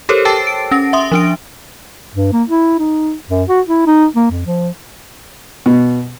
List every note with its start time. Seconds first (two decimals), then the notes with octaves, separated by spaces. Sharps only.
0.09 G4 A4 A#4 C5 C#5
0.25 G5 A5 D6 E6 A6 C7
0.47 D7
0.71 C#4 A#6
0.93 E5 C6 D#6
1.12 F3 D4 D7
2.15 G2
2.33 A#3
2.49 E4
2.79 D#4
3.29 F#2
3.49 F#4
3.67 E4
3.87 D#4
4.16 A#3
4.31 F2
4.47 F3
5.66 B2